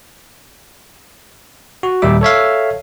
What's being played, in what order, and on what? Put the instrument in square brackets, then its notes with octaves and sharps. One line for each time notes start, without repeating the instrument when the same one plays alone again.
[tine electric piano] F#4
D#2 A#2 G3 E5 D6
A4 C#5 E5 F5